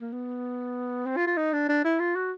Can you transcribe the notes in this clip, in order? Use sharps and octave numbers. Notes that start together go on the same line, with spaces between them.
A#3
B3
C4
F4
F4
D#4
D4
D4
E4
F4
F#4